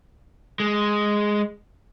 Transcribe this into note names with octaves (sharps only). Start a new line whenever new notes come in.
G#3